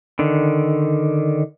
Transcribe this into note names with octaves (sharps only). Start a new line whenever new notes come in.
D3 D#3